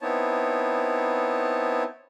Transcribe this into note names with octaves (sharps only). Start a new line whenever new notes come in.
B3 C4 D#4 E4 C#5 A5